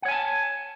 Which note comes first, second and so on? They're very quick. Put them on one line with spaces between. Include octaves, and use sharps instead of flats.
F#5 C#5 G#5 A5